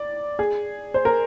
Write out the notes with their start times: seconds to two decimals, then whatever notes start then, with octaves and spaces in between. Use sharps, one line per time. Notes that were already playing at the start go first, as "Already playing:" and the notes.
Already playing: D5
0.39 G#4
0.94 C5
1.05 A#4